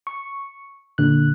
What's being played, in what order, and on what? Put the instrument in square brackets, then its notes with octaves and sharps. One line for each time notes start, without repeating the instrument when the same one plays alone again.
[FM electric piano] C#6
A#2 D3 F#6